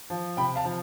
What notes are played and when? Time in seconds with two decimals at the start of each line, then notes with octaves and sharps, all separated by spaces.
0.10 F3
0.37 C3 G5 B5
0.56 F5 A5
0.65 F3